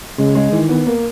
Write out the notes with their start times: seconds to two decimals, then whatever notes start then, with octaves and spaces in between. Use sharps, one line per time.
0.18 C#3 G#3
0.35 G#3
0.52 D#3 E3
0.69 B3
0.86 A#3